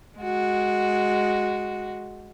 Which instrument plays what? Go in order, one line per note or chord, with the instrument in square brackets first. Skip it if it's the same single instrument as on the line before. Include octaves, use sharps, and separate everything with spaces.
[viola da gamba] G#3 F#4